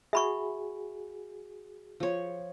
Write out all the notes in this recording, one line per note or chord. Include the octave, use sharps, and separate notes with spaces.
F#4 G#4 E5 B5 C#6
F3 C#5